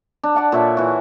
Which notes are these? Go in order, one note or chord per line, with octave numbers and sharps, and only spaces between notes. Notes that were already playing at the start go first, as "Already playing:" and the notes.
D4
D5 F#5 A5
A#2 A4 C#5 E5
E3 F#4